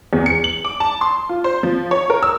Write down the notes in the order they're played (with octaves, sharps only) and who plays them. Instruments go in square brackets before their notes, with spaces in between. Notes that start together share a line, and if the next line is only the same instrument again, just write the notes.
[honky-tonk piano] E2
C#7
F#7
D6
A5
C6
F4
C5
F3
C#5
A#4
E6